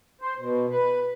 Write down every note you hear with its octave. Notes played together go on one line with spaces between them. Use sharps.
C5
B2
B4